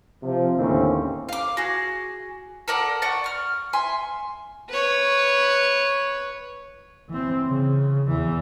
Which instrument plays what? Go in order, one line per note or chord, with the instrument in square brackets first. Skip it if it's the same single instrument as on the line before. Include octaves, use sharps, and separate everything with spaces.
[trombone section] C3 F3
D#2 A2 D3 C4 C#4
[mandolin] F5 D6
F#4 G#4
A4 A#4 D5 F#5
D5 F#5 C#6
C#6 F6
E5 G#5 C6
[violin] B4 C#5
[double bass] E3 C4
C#3
E2 E3